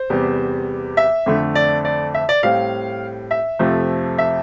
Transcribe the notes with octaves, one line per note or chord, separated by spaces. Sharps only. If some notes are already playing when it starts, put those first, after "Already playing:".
Already playing: C5
E2 C3 G3 B3
E5
F2 D3 A3
D5
D5
E5
D5
A2 G3 C4 F5
E5
F2 C3 F3 A3
E5